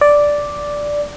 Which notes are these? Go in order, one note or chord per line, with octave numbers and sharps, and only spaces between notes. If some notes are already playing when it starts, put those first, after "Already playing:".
D5